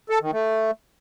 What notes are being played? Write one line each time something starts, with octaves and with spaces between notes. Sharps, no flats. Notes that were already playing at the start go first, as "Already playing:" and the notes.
A4
D#3
A3